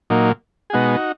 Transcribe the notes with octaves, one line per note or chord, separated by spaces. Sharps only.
A#2 F#3 A#3 D#4
G#4
B2 G#3 B3 D#4 F#4